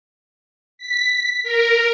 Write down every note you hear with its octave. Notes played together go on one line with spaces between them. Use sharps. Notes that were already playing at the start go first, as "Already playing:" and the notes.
B6
A#4